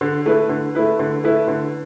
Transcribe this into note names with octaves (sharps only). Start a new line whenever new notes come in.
D3
A3 E4 B4
D3
A3 E4 B4
D3
A3 E4 B4
D3